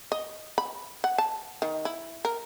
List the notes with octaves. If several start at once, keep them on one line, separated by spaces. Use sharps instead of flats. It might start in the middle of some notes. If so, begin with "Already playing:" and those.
D#5
B5
F#5
A5
D#3
E4
A#4